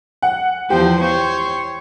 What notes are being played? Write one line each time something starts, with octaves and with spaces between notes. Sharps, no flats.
F#5
E2 F3 G4 C5
C5 C#5